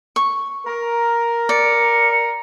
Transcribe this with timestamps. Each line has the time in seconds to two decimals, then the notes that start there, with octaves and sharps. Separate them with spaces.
0.16 C#6
0.66 A#4
1.49 D5 C#7